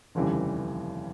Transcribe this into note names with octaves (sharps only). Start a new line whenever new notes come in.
F1 D#2 C#3 E3 G3